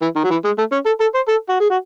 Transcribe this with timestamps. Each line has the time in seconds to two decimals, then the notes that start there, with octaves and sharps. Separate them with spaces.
0.02 E3
0.16 D#3
0.24 F#3
0.30 E3
0.44 G#3
0.58 A3
0.72 C#4
0.86 A4
1.00 A4
1.14 C5
1.28 A4
1.49 F#4
1.60 G#4
1.70 F#4